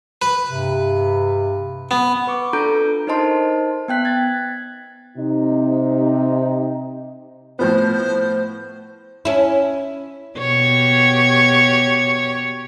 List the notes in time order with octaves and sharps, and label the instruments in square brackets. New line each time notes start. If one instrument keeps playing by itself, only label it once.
[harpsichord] B4
[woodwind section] G2 C3
[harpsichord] B3
[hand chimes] B4 C#6 D6
D4 F4 A4 A#5 G6 D7
D#4 A#4 C5 D#5 A5 C6
B3 G5 F#6 B6
G#6 A6
[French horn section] C3 D#4
[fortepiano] A2 F3 B3 [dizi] C5
[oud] C#4 E4
[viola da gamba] B2 G4 C#5